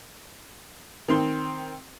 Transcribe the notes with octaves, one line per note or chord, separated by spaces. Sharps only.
D#3 C4 C6